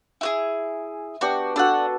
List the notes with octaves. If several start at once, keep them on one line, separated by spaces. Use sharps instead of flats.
E4 F#4 G#4
B3 D4 F#4 G4
D4 F#4 A4 B4 F#5